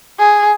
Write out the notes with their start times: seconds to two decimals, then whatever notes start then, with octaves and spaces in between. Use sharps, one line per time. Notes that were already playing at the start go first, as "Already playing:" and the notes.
0.19 G#4